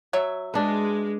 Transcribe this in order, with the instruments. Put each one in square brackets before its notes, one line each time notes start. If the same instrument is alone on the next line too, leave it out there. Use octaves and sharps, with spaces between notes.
[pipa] F#3 C#5 E5
[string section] G#3 [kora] D4 B4